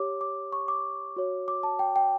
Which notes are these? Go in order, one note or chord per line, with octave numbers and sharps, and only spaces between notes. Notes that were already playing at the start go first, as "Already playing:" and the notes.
Already playing: G4 C#5 D6
D6
C#6
D6
F#4 C#5
D6
A5
G5
G5